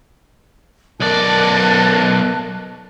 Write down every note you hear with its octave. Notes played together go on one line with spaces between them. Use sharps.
B1 A#4 D5 A5 F#6